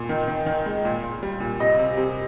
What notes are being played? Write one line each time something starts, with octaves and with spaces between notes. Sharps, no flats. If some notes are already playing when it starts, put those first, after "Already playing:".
Already playing: A#2
D#3
D#3
D#3
G#3
A#2
A#2
G3
A#2
C3 D#5
C3
C3